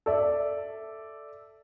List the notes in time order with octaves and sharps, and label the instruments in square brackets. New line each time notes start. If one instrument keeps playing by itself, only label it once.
[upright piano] A4 D5 E5